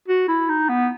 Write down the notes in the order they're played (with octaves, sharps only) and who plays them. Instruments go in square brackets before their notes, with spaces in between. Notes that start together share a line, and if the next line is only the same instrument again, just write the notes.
[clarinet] F#4
E4
D#4
B3